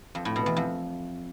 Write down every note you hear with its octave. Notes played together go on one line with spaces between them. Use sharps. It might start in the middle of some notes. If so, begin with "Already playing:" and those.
F2
A2
B2
E2
F2